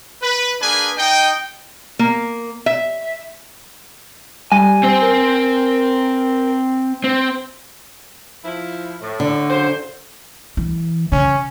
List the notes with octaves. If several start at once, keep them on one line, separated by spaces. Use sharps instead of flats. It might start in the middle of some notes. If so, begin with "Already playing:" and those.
B4
A#3 D4 G#4 B4 G#5
D#4 D#5 G5
A#3
E5
G3 G#5
C4 C5
A#4
C4
F3 E4
A2
D3
C#3 F#3 C5
E3
C#3 C#4